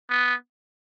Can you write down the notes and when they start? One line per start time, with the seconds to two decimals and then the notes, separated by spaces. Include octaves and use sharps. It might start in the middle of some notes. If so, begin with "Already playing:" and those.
0.10 B3